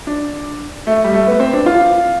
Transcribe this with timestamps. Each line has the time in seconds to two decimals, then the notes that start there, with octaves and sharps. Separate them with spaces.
0.07 D4
0.87 A3
1.04 G3
1.14 A3
1.27 B3
1.40 C4
1.53 D4
1.66 F4